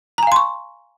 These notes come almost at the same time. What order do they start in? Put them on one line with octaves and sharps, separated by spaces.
A#5 G#5 F5 C6 C#6